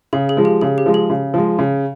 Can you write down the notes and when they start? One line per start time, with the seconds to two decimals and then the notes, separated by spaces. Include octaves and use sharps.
0.13 C#3 G#4
0.29 G#4
0.37 F3 G#3
0.45 G4
0.61 C#3 G#4
0.78 G4
0.86 F3 G#3
0.94 G#4
1.10 C#3
1.34 F3 G#3
1.59 C#3